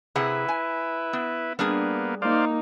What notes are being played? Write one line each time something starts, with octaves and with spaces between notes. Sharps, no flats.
C3 E4 G#4 B4 F#5
G#5
B3
G3 A#3 B3 D4 G#4
A#3 D#4 C5 D5 F5